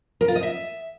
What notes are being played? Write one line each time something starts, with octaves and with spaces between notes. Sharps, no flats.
A#4
F4
D#5
E5